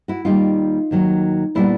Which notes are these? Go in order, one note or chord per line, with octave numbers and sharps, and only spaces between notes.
E4 F#4
D#2 D#3 G3 A#3 D#4 F4
D#2 D#3 F#3
A#2 G3 B3 D4 E4